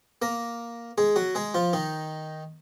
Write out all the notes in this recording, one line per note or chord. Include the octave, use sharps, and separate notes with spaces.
A#3 A#4
G#3 G#4
F#3 F#4
G#3 G#4
F3 F4
D#3 D#4